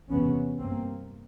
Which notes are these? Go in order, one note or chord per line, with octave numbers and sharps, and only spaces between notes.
E2 C3 B3 C#4
G2 A#3 C4